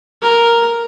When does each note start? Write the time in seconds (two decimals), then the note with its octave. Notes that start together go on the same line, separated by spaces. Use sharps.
0.22 A#4